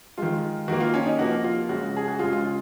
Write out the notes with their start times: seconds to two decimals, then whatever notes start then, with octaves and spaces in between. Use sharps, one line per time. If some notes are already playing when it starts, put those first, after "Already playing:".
0.18 D#3 G#3 F4
0.68 D#3 A#3 F#4
0.80 F4
0.94 C#4
1.06 D#4
1.19 C3 F3 A#3 F#4
1.44 F4
1.69 C#3 G#3 F#4
1.97 G#4
2.08 F#4
2.19 C#3 G#3 F4
2.33 F4
2.45 F4